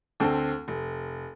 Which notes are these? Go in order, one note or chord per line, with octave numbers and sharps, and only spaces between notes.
D2 C4 A4
F1